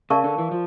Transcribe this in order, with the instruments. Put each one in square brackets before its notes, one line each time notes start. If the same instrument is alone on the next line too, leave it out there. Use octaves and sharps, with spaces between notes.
[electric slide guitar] C#3 [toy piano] A#4 D5 F5 A5 C#6
[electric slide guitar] D3
E3
F3